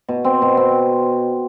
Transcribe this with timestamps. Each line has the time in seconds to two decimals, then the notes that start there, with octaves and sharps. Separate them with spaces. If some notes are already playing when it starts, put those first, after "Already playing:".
0.08 B2
0.24 C4
0.42 B2
0.57 C4